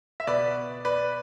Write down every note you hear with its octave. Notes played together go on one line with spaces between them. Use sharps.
E5
B2 B4 D5
B4 D5